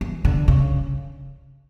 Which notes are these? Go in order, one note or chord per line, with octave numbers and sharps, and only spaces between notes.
E3
D3
C#3